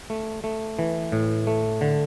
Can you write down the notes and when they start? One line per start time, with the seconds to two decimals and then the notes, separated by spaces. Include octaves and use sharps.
0.10 A3
0.44 A3
0.79 E3
1.12 A2
1.47 A3
1.81 D3